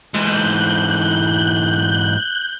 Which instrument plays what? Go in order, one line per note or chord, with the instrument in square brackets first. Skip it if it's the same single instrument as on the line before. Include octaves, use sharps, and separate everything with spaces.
[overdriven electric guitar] G#2 E3 [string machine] F#6 G6